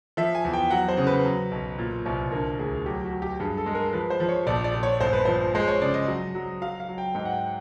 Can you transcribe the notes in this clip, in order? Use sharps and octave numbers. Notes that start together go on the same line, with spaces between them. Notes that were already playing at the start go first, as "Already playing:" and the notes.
F3 E5
G#5
E2
G5
F#3 F#5
C5
C#3
B4
F#3
B1
A#2
C2
D3 A#4
D2 G#4
F#3 G4
F#4
F#3
G4
G2 G#4
A4
G#3
A#4
F3 B4
C5
F3
C#5
A#1 D5
D5
A#1
C#5
G1 C5
B4
F3 C5
G#3 C5
C#5
C#3 D5
D#5
F#3
F#3
F#3 F5
F5
F#3
G5
G#2 G5
F#5
G5